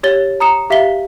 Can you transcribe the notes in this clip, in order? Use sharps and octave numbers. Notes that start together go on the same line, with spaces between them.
G4 C#5 A6 G7
A#5 D#6 C#7 E7
G4 E5 F5 B6 G7